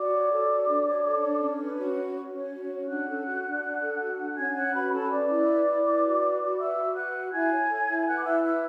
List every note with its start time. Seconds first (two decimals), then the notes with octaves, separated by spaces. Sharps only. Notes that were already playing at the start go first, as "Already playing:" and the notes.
Already playing: F#4 D5 D6
0.12 C#5
0.31 A4
0.49 F#4
0.68 D4
0.86 C#5
1.05 A4
1.24 D4
1.41 C#4
1.60 B4
1.79 F#4
1.97 C#4
2.16 C#4
2.34 C#5
2.52 F#4
2.70 C#4
2.89 D4 F#5 F#6
3.08 A4
3.26 F#4
3.45 D4
3.63 D4
3.81 A4
4.00 F#4
4.19 D4
4.37 C#4 G#5 G#6
4.55 C#5 F#5 F#6
4.74 F#4 B4 B5
4.92 C#4 A4 A5
5.10 B4 D5 D6
5.29 E4
5.48 B4
5.66 E4
5.85 B4
6.03 F#4
6.22 B4
6.40 F#4
6.58 B4 E5 E6
6.77 F#4
6.95 B4 F#5 F#6
7.14 F#4
7.32 E4 G#5 G#6
7.51 C#5
7.69 A4
7.88 E4
8.06 B4 F#5 F#6
8.16 D6
8.25 E4 E5 E6
8.43 B4 E5 E6